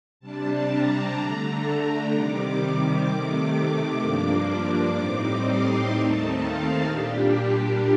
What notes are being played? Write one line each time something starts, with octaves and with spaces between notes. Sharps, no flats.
C3 G3 D4 A5
A#5
D3 A3 D4
C3 D#3 G3 D6
C3 D#3 A3 D6
D6
G2 F3 A#3 D4 D6
A2 G3 C4 D#4
C6
D#2 D#3 A3 C4 D#4 A5
F5
A#2 G3 D4 G4